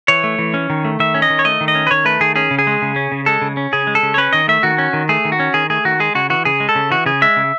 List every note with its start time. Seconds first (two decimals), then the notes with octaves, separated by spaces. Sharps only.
0.08 E3 C#5
0.24 A3
0.39 E3
0.54 C#4
0.70 D#3
0.85 A3
1.00 D#3 E5
1.14 C#4
1.22 D#5
1.30 D#3
1.39 C#5
1.45 A3 D#5
1.61 D#3
1.68 D#5
1.75 C#4
1.87 B4
1.91 D#3 C#5
2.05 A3 B4
2.21 D#3 G#4
2.36 C#4 G#4
2.51 C#3
2.59 G#4
2.67 G#3
2.82 C#3
2.96 C#4
3.12 C#3
3.26 G#3 A4
3.42 C#3
3.57 C#4
3.73 C#3 G#4
3.87 G#3
3.95 A4
4.03 C#3
4.14 C#5
4.18 C#4 B4
4.33 D#3 D#5
4.48 A3 E5
4.63 D#3 F#4
4.78 C#4
4.93 D#3
5.09 A3 G#4
5.25 D#3
5.32 F#4
5.40 C#4
5.54 D#3 G#4
5.70 A3 G#4
5.85 D#3 F#4
6.00 G#3 G#4
6.15 C#3 F#4
6.30 E3 F#4
6.45 C#3 G#4
6.60 G#3
6.69 A4
6.75 C#3
6.91 E3 F#4
7.06 C#3 G#4
7.22 G#3 E5
7.37 C#3